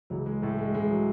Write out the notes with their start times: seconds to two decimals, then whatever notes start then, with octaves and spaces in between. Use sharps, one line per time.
0.10 C#2 C#3 E3 F#3
0.26 G#3
0.42 A2 A3
0.58 G#3
0.74 C#2 C#3 E3 G#3
0.90 F#3